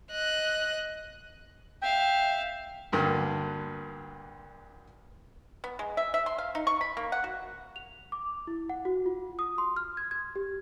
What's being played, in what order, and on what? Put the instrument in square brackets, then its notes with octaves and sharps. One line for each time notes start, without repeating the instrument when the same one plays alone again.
[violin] D#5 F#6
[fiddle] E5 F5 [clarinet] G5
[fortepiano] D2 G2 D3 A#3
[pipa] B3
G#3
E5
E5
C6
F5
D#4
C#6
B5
A#3
F#5
F#4
[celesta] F7
D6
E4
F#5
F#4
F4
D#6
C6
F6
G#6
G#6
G4